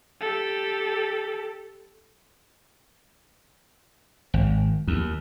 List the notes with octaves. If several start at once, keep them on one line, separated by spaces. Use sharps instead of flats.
G4 A4
G#1
D#2